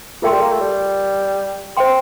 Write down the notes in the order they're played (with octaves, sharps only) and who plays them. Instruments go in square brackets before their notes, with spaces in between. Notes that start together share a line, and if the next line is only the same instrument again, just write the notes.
[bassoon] A3 [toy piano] F4 A#4 E5 G5 C6
[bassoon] G3
A#3
A3
G3
[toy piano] C5 E5 G5 C6